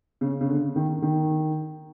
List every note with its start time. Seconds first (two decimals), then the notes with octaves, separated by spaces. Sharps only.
0.21 C#3
0.41 C#3
0.48 D3
0.76 D#3
1.02 D#3